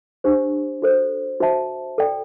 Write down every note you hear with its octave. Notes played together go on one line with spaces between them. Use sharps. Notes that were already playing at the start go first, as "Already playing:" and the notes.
D4 G4 C5
F#4 A4 C5
F#4 C5 E5 A5
A4 D5 G5